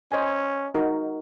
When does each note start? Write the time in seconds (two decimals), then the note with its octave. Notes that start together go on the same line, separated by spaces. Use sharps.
0.12 C#4 C5 D#5 G#5
0.74 D#4 F#4 A#4